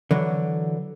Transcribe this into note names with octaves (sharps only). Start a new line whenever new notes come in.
D3 E3 F#3